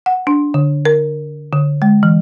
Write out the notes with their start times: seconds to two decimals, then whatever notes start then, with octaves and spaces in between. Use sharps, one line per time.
0.06 F#5
0.27 D4
0.54 D3
0.85 A#4
1.53 D3
1.82 G#3
2.03 E3